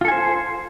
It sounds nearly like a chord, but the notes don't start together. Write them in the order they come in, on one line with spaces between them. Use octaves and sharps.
F4 A4 G#5 C5